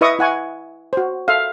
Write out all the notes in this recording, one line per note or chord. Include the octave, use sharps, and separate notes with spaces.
E4 B4 D#5 E5 C#6 D#6
E4 F#5 G#5 C#6
F#4 C5
A4 E5 F5